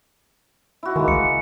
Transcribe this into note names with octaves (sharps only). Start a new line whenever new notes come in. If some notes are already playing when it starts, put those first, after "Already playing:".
E4 F#4
D#3 G#3 A#3
C#2 C#7